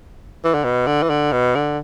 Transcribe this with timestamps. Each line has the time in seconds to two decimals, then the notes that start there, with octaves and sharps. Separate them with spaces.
0.44 E3
0.54 D3
0.64 B2
0.87 D3
1.03 E3
1.10 D3
1.32 B2
1.55 D3